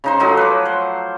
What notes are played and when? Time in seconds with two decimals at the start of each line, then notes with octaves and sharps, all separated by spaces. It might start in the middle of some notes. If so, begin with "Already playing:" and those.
0.04 C#3 D#4 C5
0.20 F3 F#3 A3 D#4
0.37 B4 D6
0.65 C5